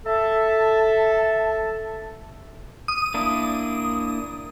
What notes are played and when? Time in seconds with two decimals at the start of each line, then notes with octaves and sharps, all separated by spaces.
0.06 A4 E5 A5
2.88 D#6
3.14 A#3 D4 E4